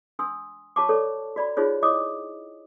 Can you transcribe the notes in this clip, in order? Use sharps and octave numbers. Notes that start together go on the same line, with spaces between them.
D4 G#5 C6 D#6 E6
F#4 C#5 A5 C#6 D6
A4 C#5 D5
F#4 D5 B5
D#4 F4 F#4 G#4 C5 C#5
E4 C#5 D#5 D6 D#6